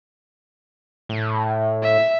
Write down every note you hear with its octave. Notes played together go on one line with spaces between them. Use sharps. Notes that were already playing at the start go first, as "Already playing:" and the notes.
A2
E5